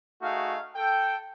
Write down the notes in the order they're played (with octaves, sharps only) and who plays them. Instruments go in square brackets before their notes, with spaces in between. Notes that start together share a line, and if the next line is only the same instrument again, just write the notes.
[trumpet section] A3 D#4 F#4 G#4 F5
A4 G5